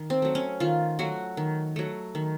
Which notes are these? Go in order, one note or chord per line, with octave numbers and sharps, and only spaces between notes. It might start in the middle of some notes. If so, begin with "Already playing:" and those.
Already playing: D#3
C4
F#3 A3
C#4
D#3 F4
F#3 A3 F#4
D#3
F#3 A3
D#3